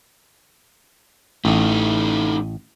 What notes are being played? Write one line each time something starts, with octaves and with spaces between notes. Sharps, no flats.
A1 A3 D#4